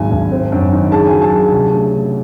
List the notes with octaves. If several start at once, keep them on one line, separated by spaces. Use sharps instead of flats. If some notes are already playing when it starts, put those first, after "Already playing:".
Already playing: G#1 G#2 F#3 G#5
G#1
C4
F#2
D#3
C#3 A5
G#5
F#3
A5
C#3
C2
A3
A3